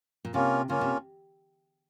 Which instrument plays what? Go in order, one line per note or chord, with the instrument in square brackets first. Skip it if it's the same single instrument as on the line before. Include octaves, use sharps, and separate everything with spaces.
[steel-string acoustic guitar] A#2
[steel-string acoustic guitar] C3 [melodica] A#3 C#4 F4
[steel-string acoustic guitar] C#3 [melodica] A#3 C#4 F4
[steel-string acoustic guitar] C3